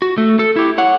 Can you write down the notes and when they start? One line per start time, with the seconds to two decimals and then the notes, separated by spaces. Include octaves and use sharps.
0.02 F#4
0.18 A3
0.39 A4
0.56 E4 G4
0.78 C#5 F#5